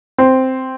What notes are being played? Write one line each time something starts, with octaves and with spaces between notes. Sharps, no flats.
C4